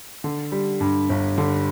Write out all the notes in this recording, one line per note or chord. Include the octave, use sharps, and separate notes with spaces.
D3
G3
G2
G1
D3